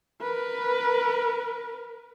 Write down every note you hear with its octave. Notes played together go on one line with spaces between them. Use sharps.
A#4 B4